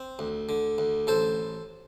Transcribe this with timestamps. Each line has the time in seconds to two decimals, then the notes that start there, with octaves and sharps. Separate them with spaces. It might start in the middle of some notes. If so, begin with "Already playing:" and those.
Already playing: C4
0.19 D2
0.49 D3
0.78 D2
1.07 A1 A4 C5